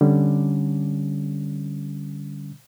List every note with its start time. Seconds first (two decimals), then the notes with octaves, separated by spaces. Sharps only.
0.01 D3 G3 C#4